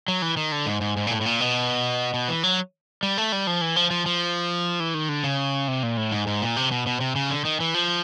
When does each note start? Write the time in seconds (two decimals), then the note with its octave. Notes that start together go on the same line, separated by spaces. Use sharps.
0.08 F#3
0.22 E3
0.37 D#3
0.52 D3
0.66 G#2
0.81 G#2
0.97 G#2
1.07 A#2
1.11 A2
1.21 A2
1.26 A#2
1.41 B2
2.14 B2
2.29 E3
2.43 F#3
3.03 G3
3.18 A3
3.32 G3
3.47 F3
3.61 E3
3.76 F3
3.91 F3
4.06 F3
4.80 E3
4.94 D#3
5.09 D3
5.24 C#3
5.68 C3
5.83 A#2
5.97 A2
6.12 G#2
6.27 G#2
6.42 A#2
6.57 C3
6.71 B2
6.86 B2
7.00 C3
7.16 C#3
7.30 D3
7.45 D#3
7.60 E3
7.74 F3